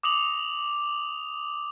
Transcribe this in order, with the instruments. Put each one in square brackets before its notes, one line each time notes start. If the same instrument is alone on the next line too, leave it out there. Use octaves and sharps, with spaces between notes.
[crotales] D6 D#6 F7 F#7